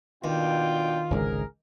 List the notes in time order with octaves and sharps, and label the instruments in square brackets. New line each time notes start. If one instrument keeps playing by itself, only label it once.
[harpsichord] D#2 [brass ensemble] B2 D4 G5 [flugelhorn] F4
[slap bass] G#1 C#2 D3 [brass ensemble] G#4 A#4